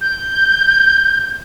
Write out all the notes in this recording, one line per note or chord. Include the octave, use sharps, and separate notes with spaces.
G6